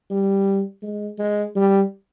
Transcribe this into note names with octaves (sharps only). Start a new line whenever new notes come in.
G3
G#3
G#3
G3